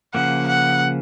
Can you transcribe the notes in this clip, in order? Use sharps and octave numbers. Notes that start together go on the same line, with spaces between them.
C#3 F3 A#3 F#5
F#5